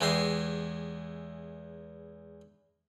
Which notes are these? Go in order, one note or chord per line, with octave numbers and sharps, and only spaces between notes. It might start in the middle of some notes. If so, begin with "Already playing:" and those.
E2 E3 G#3 G4 C6